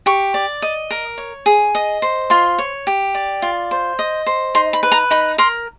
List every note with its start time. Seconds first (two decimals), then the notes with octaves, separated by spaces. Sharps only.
0.06 G4 C#6
0.34 D5
0.62 D#5
0.90 A#4
1.18 C#5
1.46 G#4
1.75 D#5
2.02 C5
2.30 F4 C6
2.58 C#5
2.87 G4
3.15 D5
3.42 F4
3.71 C5
3.99 D#5
4.26 C5
4.55 D#4 C6
4.73 B5
4.83 B4
4.92 A#5
5.10 D#4 B5
5.38 A#4 C6